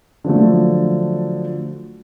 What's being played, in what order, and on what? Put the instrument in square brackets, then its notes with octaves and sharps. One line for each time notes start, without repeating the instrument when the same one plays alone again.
[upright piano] D3 F3 F#3 A3